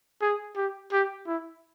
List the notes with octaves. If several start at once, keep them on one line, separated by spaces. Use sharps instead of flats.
G#4
G4
G4
E4